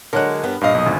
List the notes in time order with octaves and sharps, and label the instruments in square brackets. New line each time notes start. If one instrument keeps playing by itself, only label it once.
[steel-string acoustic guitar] D3 F#3 G#3 [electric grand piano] A#4 C#5 F#6
[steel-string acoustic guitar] G2 B3
[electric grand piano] G2 F5 [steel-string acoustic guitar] A#2 D#5
[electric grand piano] B1 D#6
G#1 D2